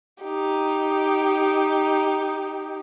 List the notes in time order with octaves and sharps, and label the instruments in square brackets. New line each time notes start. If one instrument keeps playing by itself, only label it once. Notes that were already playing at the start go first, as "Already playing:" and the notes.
[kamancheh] D#4 G4